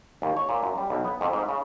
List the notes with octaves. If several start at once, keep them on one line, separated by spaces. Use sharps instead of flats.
D#2
C#5
A#2
F#2
G3
B1
B3
F2
G#2
C#3